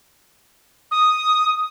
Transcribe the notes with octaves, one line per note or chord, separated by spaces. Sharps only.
D#6